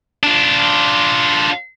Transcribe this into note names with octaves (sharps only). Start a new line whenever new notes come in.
D4 F4